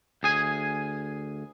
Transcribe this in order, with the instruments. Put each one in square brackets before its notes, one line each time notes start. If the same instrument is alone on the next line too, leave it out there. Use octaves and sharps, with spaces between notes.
[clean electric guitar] D2 G#4 G#5